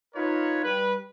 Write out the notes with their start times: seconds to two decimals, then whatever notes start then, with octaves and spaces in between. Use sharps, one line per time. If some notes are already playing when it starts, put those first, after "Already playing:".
0.15 D#4 F4 A#4 B4 C#5
0.64 G3 B4